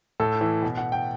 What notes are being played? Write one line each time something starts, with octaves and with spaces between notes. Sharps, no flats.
A2 A4
E3
B2
F#5
G5